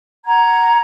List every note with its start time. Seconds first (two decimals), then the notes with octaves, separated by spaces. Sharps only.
0.25 F#5 A#5 G#6